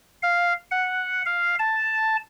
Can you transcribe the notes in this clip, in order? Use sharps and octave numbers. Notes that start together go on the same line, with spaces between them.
F5
F#5
F5
A5